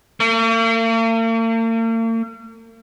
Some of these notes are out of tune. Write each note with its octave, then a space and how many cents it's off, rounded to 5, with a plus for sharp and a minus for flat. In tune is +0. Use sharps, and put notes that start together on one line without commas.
A#3 -45